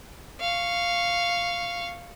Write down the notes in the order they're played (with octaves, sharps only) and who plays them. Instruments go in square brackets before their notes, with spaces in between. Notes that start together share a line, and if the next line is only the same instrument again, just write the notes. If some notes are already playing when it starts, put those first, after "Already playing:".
[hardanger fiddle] F5 C#6